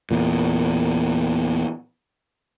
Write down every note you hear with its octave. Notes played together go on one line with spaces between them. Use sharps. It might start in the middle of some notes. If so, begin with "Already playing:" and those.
E2 A#2